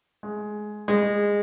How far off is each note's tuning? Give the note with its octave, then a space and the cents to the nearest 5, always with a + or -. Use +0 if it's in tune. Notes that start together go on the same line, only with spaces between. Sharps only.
G#3 +15
G#3 -20